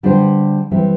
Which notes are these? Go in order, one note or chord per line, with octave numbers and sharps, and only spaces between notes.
D3 G3 D4 G4 C5
E3 G3 C4